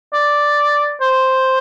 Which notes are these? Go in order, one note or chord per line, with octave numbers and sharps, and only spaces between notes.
D5
C5